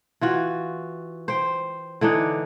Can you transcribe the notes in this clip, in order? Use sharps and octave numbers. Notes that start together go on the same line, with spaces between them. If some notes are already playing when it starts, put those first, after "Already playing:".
E3 F4 F#4
C5 G5
D3 E3 D4 D#4